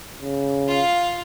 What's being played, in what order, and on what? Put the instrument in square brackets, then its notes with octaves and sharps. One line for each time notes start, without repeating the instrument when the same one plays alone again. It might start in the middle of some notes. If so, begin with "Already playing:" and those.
[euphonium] C#3
[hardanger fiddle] F4 F5